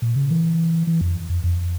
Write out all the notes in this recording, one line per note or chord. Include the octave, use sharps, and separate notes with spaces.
A#2
C#3
E3
E3
F2
F2
F2